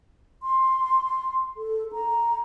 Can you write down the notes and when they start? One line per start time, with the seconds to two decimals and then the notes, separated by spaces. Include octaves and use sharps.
0.43 C6
1.57 A4
1.93 A#5